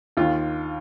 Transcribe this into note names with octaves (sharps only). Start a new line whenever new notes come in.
D#2 D#3 F4